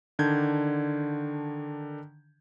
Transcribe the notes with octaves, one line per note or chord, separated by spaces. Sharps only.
D3 D#3 D4 G6 G#6